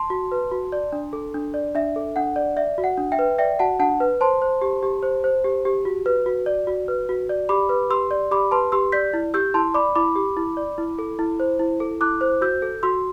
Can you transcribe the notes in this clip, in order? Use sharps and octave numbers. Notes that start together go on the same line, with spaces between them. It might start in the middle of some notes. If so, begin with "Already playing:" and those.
Already playing: A5 C6
F#4
B4
F#4
D5
D4
A4
D4
D5
D4 E5
A4
D4 F#5
D5
D5 E5
F#4
F#5
D4
E5 G5
B4
D5 E5 G5
F#4 F#5 A5
D4 F#5 A5
B4
C5 A5 C6
C5
G4
G4
C5
C5
G4
G4
F#4
B4
F#4
D5
F#4
B4
F#4
D5
G4 B5 D6
B4
G4 C6 E6
D5
G4 B5 D6
B4 A5 C6
G4 C6 E6
D5 G6 B6
E4
G4 E6 G6
E4 A5 C6
D5 B5 D6
E4 B5 D6
G4
E4
D5
E4
A4
E4
C5
E4
A4
E4 D6 F#6
C5
F#4 E6 G6
A4
F#4 C6 E6